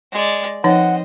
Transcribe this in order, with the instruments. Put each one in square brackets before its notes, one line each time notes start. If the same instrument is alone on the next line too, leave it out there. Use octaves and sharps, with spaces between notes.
[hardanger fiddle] G#3 D5
[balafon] F3 D#4 C#5 [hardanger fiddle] C4 D#5 [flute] F#5